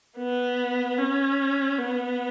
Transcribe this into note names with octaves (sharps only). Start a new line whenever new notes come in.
B3
C#4
B3